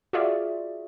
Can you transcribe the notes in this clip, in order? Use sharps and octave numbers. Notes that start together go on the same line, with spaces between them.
F4 F#4 G#4 D5 E5